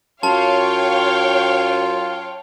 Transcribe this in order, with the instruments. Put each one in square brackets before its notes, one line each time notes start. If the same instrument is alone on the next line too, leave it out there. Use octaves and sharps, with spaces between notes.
[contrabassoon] F#2 [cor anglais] F4 [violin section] C#5 F5 G5 [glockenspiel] A5